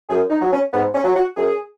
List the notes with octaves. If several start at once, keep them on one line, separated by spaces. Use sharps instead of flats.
F#2 G#4
D#4
F#3
C#4
G#2 B3
C#4
F#3
F#4
F#2 G#4